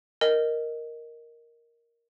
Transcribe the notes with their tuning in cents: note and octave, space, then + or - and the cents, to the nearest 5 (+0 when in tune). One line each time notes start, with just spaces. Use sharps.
A#4 +0 D#5 +0